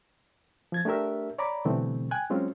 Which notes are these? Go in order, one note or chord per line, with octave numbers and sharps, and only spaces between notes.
F3 G#6 A6
A3 D4 G4 A#4 E5
C#5 D5 A#5 B5 D6
B2 D3 E3 G3 A3 C4
G5 G#5 F#6
F#3 G#3 C4 C#4 F4